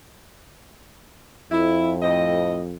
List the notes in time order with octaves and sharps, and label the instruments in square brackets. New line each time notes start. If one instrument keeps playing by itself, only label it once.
[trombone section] F2 [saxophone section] E4
[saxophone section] A2 C4 D#5